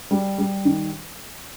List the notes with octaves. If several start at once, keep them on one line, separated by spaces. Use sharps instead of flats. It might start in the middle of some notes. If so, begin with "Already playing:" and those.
G3
G3
D#3